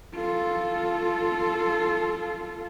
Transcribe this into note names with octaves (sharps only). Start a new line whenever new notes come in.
F4 A4